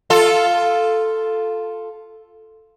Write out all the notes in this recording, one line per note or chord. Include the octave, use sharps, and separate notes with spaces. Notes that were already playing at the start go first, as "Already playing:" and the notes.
F4 A4